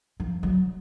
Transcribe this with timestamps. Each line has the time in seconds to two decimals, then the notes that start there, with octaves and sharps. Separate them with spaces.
0.20 F3
0.43 F#3